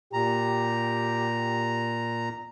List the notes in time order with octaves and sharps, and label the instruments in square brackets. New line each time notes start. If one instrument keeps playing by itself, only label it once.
[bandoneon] A#2 A#5 [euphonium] G4